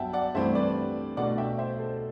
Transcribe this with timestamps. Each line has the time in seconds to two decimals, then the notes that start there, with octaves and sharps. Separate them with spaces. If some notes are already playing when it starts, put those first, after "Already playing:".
Already playing: G2 F#3 B3 E5 F#5 G5 A5
0.13 D5 F#5
0.35 G2 E3 A3 C4 C5 E5
0.55 B4 D5
1.17 B2 A3 D4 D5 F#5
1.38 E5 G5
1.58 C5 E5
1.79 A4 C5